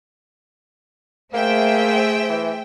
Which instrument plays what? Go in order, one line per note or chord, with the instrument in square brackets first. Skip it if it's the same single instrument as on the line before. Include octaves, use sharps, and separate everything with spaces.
[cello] A3 G#4 [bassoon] A#3 [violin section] C5 E5 G5
[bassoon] E3